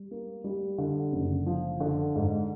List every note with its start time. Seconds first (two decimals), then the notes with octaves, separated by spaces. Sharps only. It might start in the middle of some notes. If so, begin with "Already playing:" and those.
Already playing: G3
0.11 A#3
0.44 G3
0.78 D3
1.12 F#1
1.46 F3
1.80 D3
2.15 G#2